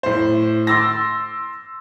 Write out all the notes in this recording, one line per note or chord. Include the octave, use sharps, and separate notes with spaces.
A2 C5
C6 D6 E6 A6 A#6